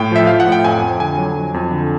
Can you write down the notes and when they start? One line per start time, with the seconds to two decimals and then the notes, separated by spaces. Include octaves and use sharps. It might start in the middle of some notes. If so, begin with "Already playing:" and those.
Already playing: A2 G5
0.12 F3 E5
0.27 F3 F5
0.40 F#5
0.47 A2
0.52 G5
0.64 F2 G#5
0.83 F2
1.00 D3 G#5
1.18 F#3
1.36 F2
1.54 F2
1.71 D3